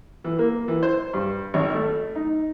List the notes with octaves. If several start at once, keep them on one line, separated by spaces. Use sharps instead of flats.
E3
A#3
E3
C5
G2
G#1
A3
D#4